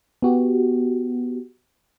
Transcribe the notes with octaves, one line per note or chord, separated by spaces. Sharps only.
B3 F#4 G4